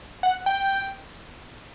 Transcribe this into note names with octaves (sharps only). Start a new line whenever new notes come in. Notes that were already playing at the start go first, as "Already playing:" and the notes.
F#5
G5